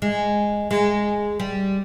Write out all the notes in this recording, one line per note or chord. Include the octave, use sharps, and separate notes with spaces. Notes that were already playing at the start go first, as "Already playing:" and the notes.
G#3
G#3
G3